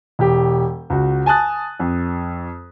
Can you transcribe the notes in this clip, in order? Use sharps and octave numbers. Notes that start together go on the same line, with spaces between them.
E1 G4
C#2 F#4
G#5 A5 D#6 F#6 A6
F2